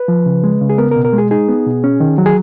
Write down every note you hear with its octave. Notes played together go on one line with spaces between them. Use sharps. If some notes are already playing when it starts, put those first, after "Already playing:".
Already playing: B4
F3
C#3
G#3
C#3
G#4
B3 A#4
A#4
B2
A#4
G#3 G#4
D#4 G#4
B3
B2
C#4
D#3
F#3
G#4